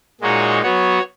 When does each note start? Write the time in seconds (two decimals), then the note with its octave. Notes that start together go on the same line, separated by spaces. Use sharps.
0.21 A#2 G#3 D#4 F#4 C#5
0.62 F#3 B3 F#4 C#5